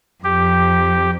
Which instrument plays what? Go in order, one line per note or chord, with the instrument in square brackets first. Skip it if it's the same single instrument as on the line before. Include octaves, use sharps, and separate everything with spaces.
[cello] F2 [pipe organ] G4